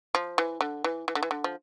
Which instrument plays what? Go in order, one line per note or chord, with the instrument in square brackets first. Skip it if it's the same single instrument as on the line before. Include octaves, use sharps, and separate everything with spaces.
[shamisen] F3
E3
D3
E3
E3
D3
E3
D3
F3